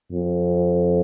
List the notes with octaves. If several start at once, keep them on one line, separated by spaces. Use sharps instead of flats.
F2